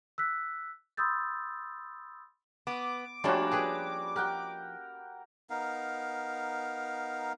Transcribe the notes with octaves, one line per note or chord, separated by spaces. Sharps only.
E6 F#6 B6
B5 C6 D#6 E6 G6 A6
B3 D6
F3 G3 A3 A#3 C#4 D4 F#4
G4 G#4 B4
G4 A#4 F#5 G5
B3 D#4 A#4 F5